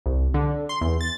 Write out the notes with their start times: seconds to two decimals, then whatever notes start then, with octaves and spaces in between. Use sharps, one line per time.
0.06 C2
0.34 D3
0.69 C6
0.81 E2
1.01 A6